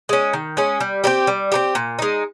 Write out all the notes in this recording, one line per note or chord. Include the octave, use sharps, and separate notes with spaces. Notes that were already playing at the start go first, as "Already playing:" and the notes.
G#3 C#4
D#3
G#3 C#4
G3
C4 D#4 G4
G3
C4 D#4 G4
A#2
G#3 D#4